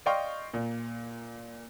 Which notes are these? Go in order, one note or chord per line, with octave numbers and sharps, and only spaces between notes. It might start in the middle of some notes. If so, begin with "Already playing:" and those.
D5 D#5 F5 G5 C6 C#6
A#2